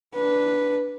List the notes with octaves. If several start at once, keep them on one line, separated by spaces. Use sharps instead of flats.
D4 B4